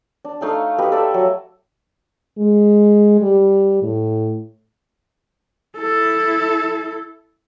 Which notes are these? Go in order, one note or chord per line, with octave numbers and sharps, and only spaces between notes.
D4
A3 D#4 F5 G#5
G4 B4 D#5
A4 D5 E5
F#3 A5
G#3
G3
A2
E4 A4